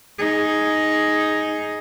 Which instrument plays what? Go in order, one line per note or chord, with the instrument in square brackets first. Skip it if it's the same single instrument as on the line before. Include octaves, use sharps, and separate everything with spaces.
[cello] D#4 G#4